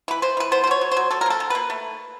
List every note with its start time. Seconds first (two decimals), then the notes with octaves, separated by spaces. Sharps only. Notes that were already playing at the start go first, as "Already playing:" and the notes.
0.08 E3 B4
0.22 E3 C5
0.37 E3 B4
0.52 B3 C5
0.64 C5
0.67 B2 C#5
0.81 F#3
0.91 C5
0.97 F#3
1.11 F#3 A4
1.21 A#4
1.26 A#3 A4
1.40 D#3
1.50 A#3 B4
1.70 A3